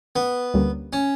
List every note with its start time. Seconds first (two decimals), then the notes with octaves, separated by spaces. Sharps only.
0.16 B3
0.54 D2 D3 G3 A#3 C#4
0.93 C#4